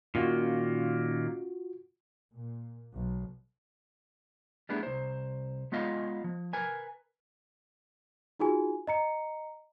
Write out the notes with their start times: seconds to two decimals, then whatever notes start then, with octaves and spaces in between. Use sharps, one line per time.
0.15 A#2 D#3 A#3 C#4 F4 F#4 F5
2.33 A#2
2.95 B1
4.69 G3 A3 B3 D4 E4 G#4
4.83 C2 C5
5.72 G#3 B3 F4 D#5 F5
6.24 F3
6.53 A#4 B4 G#5
8.40 D#4 F4 F#4 G#4 G#5
8.87 D#5 A#5 C#7